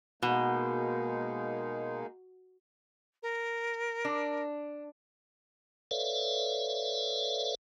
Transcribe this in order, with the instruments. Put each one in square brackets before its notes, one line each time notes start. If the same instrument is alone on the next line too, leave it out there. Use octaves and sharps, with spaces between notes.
[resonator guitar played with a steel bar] B2 [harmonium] G#3 A#3 D#4
[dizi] A#4
[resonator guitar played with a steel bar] D4
[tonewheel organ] A4 B4 C#5 D5 E5 F5